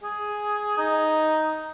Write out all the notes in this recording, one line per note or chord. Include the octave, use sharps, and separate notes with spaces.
G#4
D#4